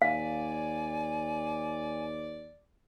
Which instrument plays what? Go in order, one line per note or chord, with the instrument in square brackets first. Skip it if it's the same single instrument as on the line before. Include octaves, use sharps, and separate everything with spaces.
[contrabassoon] D#2 [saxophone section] D5 [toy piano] F5 [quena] G#5